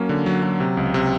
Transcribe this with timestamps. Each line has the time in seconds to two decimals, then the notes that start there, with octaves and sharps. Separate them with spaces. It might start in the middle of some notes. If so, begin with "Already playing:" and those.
Already playing: F#3 A#3 C#4
0.09 D3
0.26 F#3
0.43 F#3
0.60 C3
0.77 C#2
0.94 C3